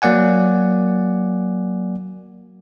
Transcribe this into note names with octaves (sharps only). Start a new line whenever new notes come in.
F#3 A#3 D5 F#5 G#5